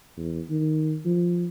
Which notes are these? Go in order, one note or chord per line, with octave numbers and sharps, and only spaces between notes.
E2
D#3
F3